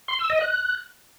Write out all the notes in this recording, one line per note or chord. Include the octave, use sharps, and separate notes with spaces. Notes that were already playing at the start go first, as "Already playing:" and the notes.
C6
E6
D#5
F#6